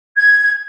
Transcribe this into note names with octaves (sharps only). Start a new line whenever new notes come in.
G#6